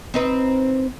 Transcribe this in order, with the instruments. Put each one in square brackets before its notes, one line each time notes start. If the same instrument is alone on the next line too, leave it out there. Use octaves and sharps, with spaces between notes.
[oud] C4 D#4 B4